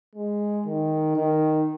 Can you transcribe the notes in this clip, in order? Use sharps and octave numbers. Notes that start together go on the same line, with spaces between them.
G#3
D#3
D#3